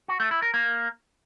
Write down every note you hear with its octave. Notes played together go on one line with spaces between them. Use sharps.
F#4
A3
E4
A#4
A#3